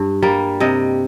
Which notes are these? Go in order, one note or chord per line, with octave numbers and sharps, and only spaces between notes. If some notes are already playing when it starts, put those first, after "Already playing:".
Already playing: G2
G3 A#3
C3 D#5